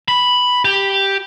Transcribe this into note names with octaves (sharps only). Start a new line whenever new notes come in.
B5
G4